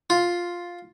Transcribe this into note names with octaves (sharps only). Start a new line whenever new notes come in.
F4